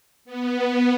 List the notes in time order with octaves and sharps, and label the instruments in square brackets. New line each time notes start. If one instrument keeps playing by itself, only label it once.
[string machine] B3